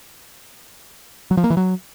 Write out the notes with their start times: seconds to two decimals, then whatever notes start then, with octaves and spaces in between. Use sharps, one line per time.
1.31 F#3
1.37 F3
1.44 A#3
1.50 E3
1.57 F#3